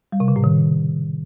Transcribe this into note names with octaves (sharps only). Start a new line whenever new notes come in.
G3
C3
C#3
A2
D#3